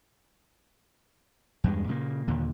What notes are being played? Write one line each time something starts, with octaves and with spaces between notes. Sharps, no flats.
E2 G2 G#3
A#2 C#3 G3 A#3
D#2 A#2 D3